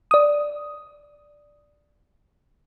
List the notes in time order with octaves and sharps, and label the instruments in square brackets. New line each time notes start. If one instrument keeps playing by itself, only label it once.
[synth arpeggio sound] D5 D#6